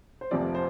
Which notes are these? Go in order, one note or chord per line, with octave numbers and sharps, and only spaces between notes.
C5
F1 F2 C3 F3 D5
C5